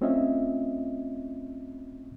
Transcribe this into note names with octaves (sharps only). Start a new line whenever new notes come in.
A3 C4 C#4 F4 D#5 E5